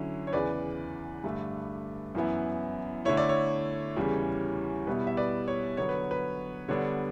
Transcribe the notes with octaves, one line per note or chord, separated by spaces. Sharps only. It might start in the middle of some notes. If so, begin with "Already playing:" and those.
Already playing: D3 F#3 C#4 E4
C#5
E2 C#3 E3 B4 D5
G2 D3 A3
F#2 E3 B3 E4
D3 A3 E4 C#5
D5
C#5
E2 C#3 E3 G3
B2 G3 B3 E4 B4
E5
B4 D5
C#5
D3 F#3 B3 C#5
B4
B4
D3 G3 B3 D4 C#5